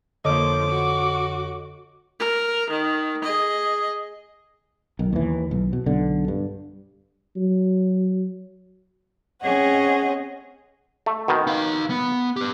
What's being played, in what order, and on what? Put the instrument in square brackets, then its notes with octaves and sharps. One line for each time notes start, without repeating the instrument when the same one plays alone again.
[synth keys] F2 D3 [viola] F3 A#3 [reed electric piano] A4 C#5 D#5 [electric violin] D6
[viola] F#4
A#4
D#3
G#4 D#5
[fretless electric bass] B1 D#3
D#2 E3
B1
B2
B1 D3
G2
[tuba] F#3
[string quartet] C4 C#4 G#4 C#5 D#5 F#5
[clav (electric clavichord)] A3
B2 D#3
[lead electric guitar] D#4 F5
B3
G4 B4